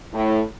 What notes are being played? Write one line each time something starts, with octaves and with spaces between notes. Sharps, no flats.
A2